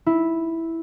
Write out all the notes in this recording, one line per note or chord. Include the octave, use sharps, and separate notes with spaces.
E4